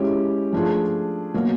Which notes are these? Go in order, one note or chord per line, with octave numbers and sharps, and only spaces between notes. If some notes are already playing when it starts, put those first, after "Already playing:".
Already playing: G#3 C#4 E4 G4
F3 A3 D4 F4 G#4
B2 F#3 A#3